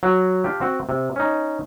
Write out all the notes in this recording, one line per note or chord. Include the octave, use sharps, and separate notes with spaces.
F#3
D4 F4 G4
C4 F#4
C3
C#4 D#4